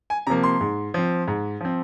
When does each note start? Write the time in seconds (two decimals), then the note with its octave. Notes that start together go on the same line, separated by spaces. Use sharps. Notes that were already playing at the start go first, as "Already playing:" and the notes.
0.10 G#5
0.27 C3 F3 A#3 A#5
0.44 C6
0.61 G#2
0.94 F3 C4
1.28 G#2
1.61 F3 C4